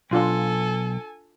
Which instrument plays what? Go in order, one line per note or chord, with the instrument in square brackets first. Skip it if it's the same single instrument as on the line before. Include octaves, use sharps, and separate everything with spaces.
[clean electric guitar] B1 [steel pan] D4 F4 C6 [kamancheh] A4 G#5